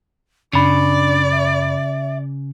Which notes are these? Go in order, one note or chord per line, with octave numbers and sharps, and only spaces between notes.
F#2 C#3 D4 D5 B5
E5